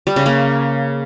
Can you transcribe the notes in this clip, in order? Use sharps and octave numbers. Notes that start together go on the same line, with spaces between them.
G3
C#3
A#3